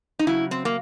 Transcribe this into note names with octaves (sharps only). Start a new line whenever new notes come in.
D#4
C#3 F#3 E4
C4
A#3